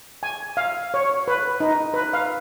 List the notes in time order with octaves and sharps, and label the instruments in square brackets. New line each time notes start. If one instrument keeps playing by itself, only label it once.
[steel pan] G#5
F5
C#5
B4
D#4
B4
F5